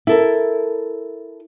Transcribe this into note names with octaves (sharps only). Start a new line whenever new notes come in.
E4 A4 A#4